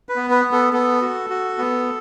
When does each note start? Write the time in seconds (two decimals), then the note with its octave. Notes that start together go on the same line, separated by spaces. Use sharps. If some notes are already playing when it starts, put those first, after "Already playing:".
0.09 B4
0.16 B3
0.30 B4
0.45 B3
0.52 A4
0.73 B3 A4
1.01 F#4
1.30 F#4
1.58 B3